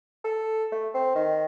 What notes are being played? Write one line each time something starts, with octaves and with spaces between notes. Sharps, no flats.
A4
A3
C4
D#3